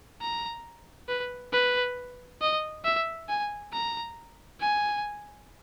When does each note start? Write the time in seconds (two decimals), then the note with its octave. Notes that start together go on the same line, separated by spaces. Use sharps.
0.21 A#5
1.08 B4
1.53 B4
2.41 D#5
2.84 E5
3.29 G#5
3.72 A#5
4.60 G#5